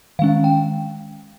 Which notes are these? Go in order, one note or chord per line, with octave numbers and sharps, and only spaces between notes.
D#3 G#3 C#4 F5
G5